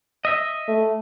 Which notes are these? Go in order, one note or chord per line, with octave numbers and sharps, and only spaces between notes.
D#5 E5
A3